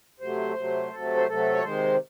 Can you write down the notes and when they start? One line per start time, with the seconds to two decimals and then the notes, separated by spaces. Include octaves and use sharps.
0.20 C3 F#3 A3 C5
0.57 C3 F#3 A3
0.92 C3 F#3 A3 A4
1.16 C5
1.28 C3 F#3 A3 A4
1.52 C#5
1.63 C3 D#3 G#3 C5